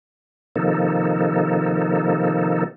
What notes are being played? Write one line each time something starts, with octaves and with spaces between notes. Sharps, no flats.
C3 D#3 F3 A#3 D#4 A4